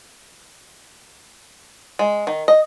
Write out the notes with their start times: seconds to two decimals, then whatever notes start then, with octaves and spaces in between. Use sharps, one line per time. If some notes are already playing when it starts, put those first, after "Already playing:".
1.99 G#3
2.27 D#3
2.48 D#5